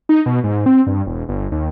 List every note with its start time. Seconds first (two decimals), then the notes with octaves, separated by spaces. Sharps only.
0.09 D#4
0.26 B2
0.44 G#2
0.66 C4
0.87 G2
1.07 E1
1.29 G1
1.52 D#2